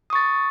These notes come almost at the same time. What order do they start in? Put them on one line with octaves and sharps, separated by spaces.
D#6 C#6 A6